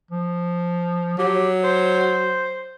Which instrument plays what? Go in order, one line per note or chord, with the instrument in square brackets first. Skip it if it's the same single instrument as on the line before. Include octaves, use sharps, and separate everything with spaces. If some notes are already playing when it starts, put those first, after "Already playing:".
[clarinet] F3
[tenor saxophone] F#3 [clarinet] G4
[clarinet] C5